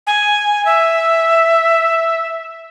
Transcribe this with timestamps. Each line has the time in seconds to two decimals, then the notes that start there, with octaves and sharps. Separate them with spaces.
0.07 G#5
0.66 E5